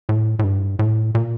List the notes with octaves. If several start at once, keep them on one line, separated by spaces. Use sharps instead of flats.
A2
A2
G2
A2
A#2